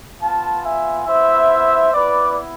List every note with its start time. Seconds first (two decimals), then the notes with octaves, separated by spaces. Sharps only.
0.22 B3 F4 F5 A5
0.65 E5 G#5
1.07 B3 E4 C5 E5
1.93 B3 E4 B4 D5